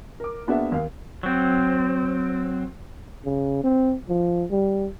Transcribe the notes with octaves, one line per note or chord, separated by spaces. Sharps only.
A#4 D6
A#3 B3 D4 F#4 G#4 E5
D#2 F5
F#3 C4
C#3
C4
F3
G3